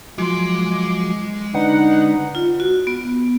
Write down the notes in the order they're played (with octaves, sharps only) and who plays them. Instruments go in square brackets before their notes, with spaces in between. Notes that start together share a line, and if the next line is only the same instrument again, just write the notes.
[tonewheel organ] F3 F#3 [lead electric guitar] G#3 C6 [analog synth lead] D6
[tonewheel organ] D3 D4 B4 [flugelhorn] D#4 [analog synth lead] F#5
[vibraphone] F4
F#4
B3